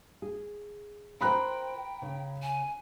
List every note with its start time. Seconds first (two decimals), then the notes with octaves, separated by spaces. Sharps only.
0.22 G#4
1.21 F4 A#4 C5 G5 A#5 B5 F#6
2.02 C#3
2.43 G#5